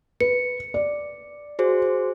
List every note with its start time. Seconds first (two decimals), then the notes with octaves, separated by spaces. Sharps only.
0.20 B4 C#7
0.74 D5
1.59 F#4 G#4 C5